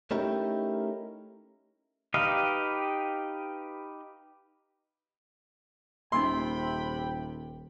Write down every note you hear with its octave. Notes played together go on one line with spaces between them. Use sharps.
A3 C#4 D#4 E4 G4 A#4
D#4 G4 B4 D#5 F5
D#1 C3 A#3 C#4 D#4 G5 B5 C6